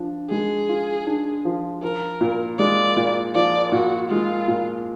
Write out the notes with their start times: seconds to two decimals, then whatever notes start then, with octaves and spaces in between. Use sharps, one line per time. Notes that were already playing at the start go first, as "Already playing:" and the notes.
Already playing: F3 D4
0.30 G#3 G#4
0.69 F4
1.06 D4
1.45 F3
1.82 F3 A#4
2.21 A#2
2.59 G#3 D5
2.97 A#2
3.35 F3 D5
3.72 A#2 F#4
4.10 G#3 F4
4.48 A#2